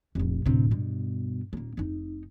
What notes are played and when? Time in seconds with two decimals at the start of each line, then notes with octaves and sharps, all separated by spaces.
0.15 F1 A#1
0.46 D1 C3
0.71 G2 B2
1.53 D#1 A#3
1.77 F1 D#4